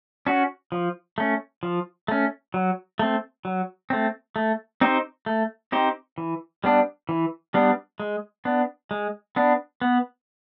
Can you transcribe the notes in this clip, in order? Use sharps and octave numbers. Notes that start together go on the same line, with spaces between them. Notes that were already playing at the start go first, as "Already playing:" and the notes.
C#4 F#4
F3
A3 C#4
F3
A3 C#4
F#3
A3 C4
F#3
A3 C4
A3
C4 D#4 G4 C5
A3
C4 D#4 G4 C5
E3
G3 B3 D4
E3
G3 B3 D4
G#3
B3 D4
G#3
B3 D4
B3